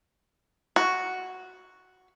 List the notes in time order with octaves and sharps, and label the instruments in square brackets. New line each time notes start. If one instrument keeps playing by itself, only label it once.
[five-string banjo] F#4